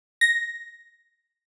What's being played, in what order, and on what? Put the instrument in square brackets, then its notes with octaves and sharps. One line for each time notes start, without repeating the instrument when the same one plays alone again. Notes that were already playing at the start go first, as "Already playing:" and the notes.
[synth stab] A#6